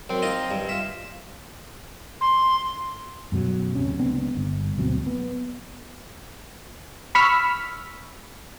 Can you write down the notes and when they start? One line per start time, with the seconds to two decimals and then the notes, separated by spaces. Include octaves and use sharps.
0.09 F#2 C4
0.22 D#4 F4 D#5
0.51 G2
0.69 F4 E5
2.20 C6
3.32 F#2 B2 F#3
3.75 D1 A#1 C3 C#4
3.99 C#2 B3 C4 D4
4.37 G1
4.78 D2 B2 F#3 C4
5.07 B3
7.15 B5 C#6 E6 F6 B6